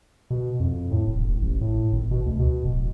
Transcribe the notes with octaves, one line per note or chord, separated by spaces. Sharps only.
B2
F2
A2
D1
E1
A1
A2
G#1
B2
D2
B2
D1